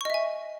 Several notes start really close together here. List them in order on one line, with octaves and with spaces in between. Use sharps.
C#6 D#5 E5 G#5